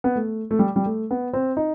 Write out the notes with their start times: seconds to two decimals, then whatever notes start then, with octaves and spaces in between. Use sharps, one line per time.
0.04 B3
0.16 A3
0.51 A3
0.59 G3
0.76 G3
0.86 A3
1.11 B3
1.33 C4
1.57 D#4